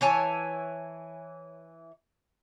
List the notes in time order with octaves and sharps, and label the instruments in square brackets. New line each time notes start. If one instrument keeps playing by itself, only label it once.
[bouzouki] E3 C#5 G#5 A5